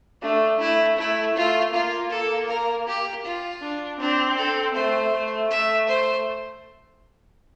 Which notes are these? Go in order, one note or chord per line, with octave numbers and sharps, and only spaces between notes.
A3 D4
A3 E4
A3 E4
A3 F4
A#3 F4
A4
A#4
G4
F4
D4
C4 D4
A4
A3 C5
A3
A3 E5
C5